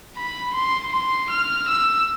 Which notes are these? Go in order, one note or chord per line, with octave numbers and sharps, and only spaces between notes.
B5
C6
C6
F6
E6